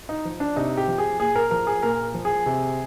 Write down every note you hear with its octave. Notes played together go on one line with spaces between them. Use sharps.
D#4
F3
D4
C3 D#4
G4
F3
G#4
A#2 G#4
A#4
F3 A#4
G#4
A#2 A#4
F3
G#4
C3